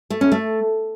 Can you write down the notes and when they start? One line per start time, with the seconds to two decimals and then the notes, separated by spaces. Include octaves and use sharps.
0.10 A3
0.21 C#4
0.32 A3